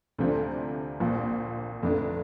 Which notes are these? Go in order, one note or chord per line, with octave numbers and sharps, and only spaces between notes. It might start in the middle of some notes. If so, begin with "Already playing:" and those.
D2 C3 F3 A3 D4
A#1 A#2 F3
F1 F2 D3 A3 D4